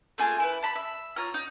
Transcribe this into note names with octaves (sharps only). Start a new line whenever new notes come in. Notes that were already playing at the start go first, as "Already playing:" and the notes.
A3 A#3 F4 G#4
E4 B4
A5 B5
E5
F4 C#5 A#5 F6
D#4